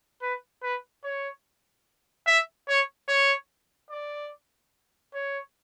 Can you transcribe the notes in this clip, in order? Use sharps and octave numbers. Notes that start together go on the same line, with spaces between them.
B4
B4
C#5
E5
C#5
C#5
D5
C#5